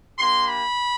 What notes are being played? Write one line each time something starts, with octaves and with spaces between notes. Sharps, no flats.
A#3 D4 G4 C6
B5